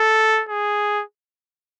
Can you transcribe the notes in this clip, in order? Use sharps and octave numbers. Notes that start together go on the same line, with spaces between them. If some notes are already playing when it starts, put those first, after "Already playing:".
Already playing: A4
G#4